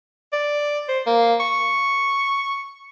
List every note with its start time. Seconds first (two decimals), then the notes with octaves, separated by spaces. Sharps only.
0.33 D5
0.89 C5
1.06 A#3
1.40 C#6